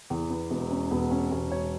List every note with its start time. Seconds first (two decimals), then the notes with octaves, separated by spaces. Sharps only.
0.10 E2
0.30 B3
0.50 E1 B3
0.71 C#4
0.91 E1 B3
1.11 C#4
1.31 E1 C#4
1.52 C#5